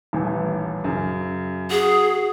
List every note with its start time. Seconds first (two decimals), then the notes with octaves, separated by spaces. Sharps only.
0.13 D#1 A1 E3
0.84 F#2 C#3
1.70 F#4 G#4